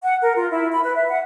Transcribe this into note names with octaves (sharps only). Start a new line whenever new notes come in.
F#5
A#4
F4
E4
B5
B4
E5
F#5